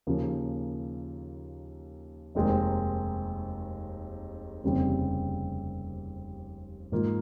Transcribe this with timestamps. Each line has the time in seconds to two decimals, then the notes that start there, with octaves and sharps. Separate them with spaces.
0.07 D#2 C#3 F3 A#3
2.35 F1 D#2 D#3 G#3 C4
4.63 F1 D#2 C#3 G3 C4
6.92 G#2 D#3 A#3 F4